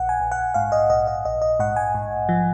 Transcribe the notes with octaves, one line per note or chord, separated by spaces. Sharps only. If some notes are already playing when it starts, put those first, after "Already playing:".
Already playing: A#1 F#5
G#5
A#1
F#5
G#2 F5
D#5
A#1 D#5
D#5
A#1 D#5
D#5
G#2 F#5
G#5
G#2
F3